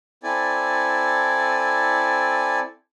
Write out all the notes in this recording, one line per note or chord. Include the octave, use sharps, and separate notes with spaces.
C4 E4 A4 D5 G#5